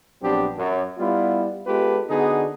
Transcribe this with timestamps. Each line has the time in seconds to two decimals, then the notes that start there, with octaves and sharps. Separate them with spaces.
0.22 A#1 F#3 B3 C4 D4 G4
0.56 F#2
0.99 G3 B3 E4 F4
1.66 G#3 B3 F4 G4 A4 B4
2.09 D3 B3 D4 D#4 F#4 G#4